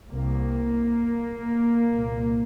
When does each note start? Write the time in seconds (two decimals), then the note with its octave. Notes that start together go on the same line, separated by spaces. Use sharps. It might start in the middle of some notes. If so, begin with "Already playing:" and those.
0.11 C2 C3 A#3
1.89 C2 A#2